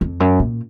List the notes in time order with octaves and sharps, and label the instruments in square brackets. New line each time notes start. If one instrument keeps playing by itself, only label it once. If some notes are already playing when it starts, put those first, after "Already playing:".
[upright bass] F2
F#2
A#2